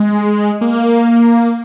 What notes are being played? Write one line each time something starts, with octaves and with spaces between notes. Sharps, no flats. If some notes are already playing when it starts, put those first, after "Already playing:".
Already playing: G#3
A#3